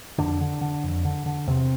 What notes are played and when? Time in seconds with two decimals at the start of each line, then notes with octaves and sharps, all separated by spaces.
0.18 F2 D3 D4
0.41 D3
0.61 D3
0.84 F2
1.05 D3
1.26 D3
1.47 E2 C3 C4